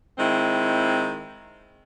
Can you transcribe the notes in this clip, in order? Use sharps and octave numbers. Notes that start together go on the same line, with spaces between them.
D#3 G#3 C4 E4